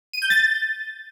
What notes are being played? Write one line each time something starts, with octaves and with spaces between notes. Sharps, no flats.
D#7
G6
A6